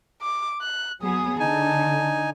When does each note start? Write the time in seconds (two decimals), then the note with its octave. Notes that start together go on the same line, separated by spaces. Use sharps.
0.22 D6
0.62 F#6
1.02 F#3 B3 G#4 D#6
1.40 D3 D#4 G#5 A5